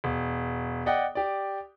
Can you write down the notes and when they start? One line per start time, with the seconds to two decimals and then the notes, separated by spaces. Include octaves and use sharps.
0.04 E1
0.86 D5 D#5 F#5 G5
1.15 G4 D5